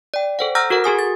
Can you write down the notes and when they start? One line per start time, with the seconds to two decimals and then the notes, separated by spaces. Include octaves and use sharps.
0.14 D5 G5
0.39 A4 C5 F#5
0.55 F#5 A#5 E6 F6 G6 A#6
0.70 F#4 A4 A#4 F#5
0.84 F#4 G#4 G#5 D#6
0.99 A6